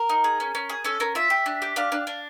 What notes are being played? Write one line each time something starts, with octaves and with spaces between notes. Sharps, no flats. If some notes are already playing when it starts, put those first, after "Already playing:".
Already playing: A#4
D#4
G#4
C#4
C#4
G#4
C#4 A4
C#4 A#4
F4 E5
G4
D4
G4
D4 F5
D4
D4